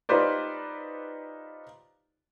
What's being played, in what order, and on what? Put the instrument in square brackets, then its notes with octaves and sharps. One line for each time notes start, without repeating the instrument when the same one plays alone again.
[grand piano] D#4 F4 G4 B4 C5 D5